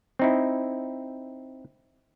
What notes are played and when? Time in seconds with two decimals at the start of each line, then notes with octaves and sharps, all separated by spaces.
0.19 C4 D#4 E4